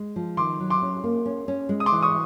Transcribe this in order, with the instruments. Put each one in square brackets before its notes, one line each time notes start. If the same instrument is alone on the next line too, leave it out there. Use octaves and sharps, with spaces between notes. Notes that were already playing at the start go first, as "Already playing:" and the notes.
Already playing: [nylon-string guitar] G#3
F3
[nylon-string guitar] D#3 [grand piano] C6 D6
[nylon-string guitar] F#3
[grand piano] C6 D6
[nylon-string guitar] C#4
A#3
C#4
C#4
G#3
[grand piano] D#6
C6 D6
[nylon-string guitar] E3
[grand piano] C#6 D#6